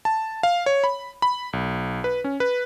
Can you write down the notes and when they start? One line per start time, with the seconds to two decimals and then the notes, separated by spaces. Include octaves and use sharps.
0.05 A5
0.43 F5
0.66 C#5
0.84 B5
1.22 B5
1.53 B1
2.04 B4
2.24 C#4
2.40 B4